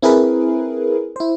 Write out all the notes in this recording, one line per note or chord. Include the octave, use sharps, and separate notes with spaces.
C4 E4 G#4 A#4 B4
E4 C5